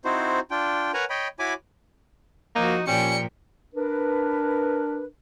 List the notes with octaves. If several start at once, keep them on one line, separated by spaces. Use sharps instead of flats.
C4 D#4 E4 F#4 C5
D4 F4 G5
A#4 B4 C#5 F#5 G#5 A#5
C#5 D#5 G5 B5
E4 F#4 C#5 G#5 B5 D6
F3 A#3 D#4 F#4
A#2 F3 G3 C#4 G5 C#7
D4 A#4 B4